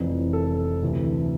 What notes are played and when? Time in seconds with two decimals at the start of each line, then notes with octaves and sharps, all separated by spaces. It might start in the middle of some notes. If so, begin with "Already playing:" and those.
Already playing: F1 F2 E3
0.33 A4
0.82 D2 C3 E3